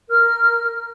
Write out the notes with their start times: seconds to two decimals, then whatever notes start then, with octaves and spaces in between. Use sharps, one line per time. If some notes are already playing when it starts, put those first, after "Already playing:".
0.10 A#4 F6